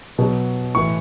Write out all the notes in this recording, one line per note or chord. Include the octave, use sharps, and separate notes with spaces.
B2 F#3
A2 E3 C#6